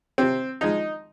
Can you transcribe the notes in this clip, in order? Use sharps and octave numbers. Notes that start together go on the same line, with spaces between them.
C3 C4
F3 G#3 D#4